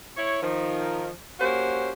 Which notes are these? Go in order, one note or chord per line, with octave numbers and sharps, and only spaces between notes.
E4 C#5
D#3 F3
A#3 C#4 F#4 G4 C5